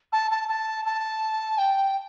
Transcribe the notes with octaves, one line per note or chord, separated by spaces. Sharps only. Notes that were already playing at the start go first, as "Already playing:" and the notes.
A5
A5
A5
A5
G5